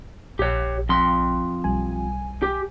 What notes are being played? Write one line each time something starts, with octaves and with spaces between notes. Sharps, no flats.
A#1 G4 C#5
F2 C6
B1 G3 G#5
G4